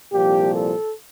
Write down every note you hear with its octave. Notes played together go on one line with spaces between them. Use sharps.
C2 A#2 F3 G4
A4